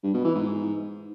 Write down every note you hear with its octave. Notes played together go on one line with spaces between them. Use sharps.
G2
B2
E3
G#2